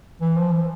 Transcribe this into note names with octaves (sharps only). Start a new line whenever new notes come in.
E3
F3
E3